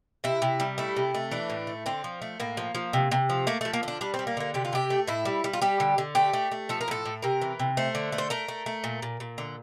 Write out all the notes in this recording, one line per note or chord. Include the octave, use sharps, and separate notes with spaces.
C3 E4
C3
G3
A3 E4
C3
A3
E3 D4
A2
A3
D3 C4
F3
A3
A2 A#3
F3
F3
C3
C3
F3
A3 A#3
F3 A3
A#3
D3 D4
G3 D4
C4
G3
A#3
D3 A#3
C3 G4
F4
C3 G4
A3
A2 E4
G3
G3
F4
G3 G4
D3
D3
A3 G4
A3
A3
F3 A4
A#4
A2 A4
A2
C3 A#4
E3
C3
A3 C5
D3
A3
C5
A3 A#4
A3
A3
A#2
A#2
A#2
D3